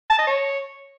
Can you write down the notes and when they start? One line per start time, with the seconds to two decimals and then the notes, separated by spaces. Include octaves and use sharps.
0.10 A5
0.19 D#5
0.27 C#5